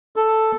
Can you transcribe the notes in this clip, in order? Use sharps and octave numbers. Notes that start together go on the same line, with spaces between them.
A4